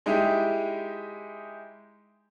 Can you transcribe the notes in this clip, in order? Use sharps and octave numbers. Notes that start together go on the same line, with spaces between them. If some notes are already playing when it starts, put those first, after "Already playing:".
G#3 D#4 E4 G4